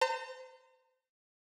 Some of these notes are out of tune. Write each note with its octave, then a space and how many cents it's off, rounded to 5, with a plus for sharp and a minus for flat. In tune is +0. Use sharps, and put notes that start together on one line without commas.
C5 -30 A#5 -40